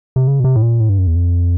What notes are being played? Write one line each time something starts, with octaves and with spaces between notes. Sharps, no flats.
C3
C#3
B2
C3
A2
A#2
A2
G2
F#2
E2
F2